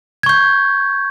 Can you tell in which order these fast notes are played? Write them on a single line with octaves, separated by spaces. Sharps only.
G#6 C#6 G6